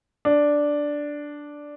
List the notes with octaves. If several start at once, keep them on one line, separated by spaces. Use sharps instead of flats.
D4